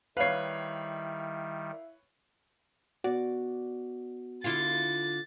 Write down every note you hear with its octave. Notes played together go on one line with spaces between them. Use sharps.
D#3 G3 E4 B4 C#5 F5 C7
B3 F#4 D5
D3 E4 F4 A6